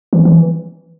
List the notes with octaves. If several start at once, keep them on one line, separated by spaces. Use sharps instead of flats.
E3
E3